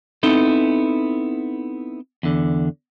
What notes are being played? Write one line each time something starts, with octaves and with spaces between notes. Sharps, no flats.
B3 C4 D#4 E4 A4
E2 D3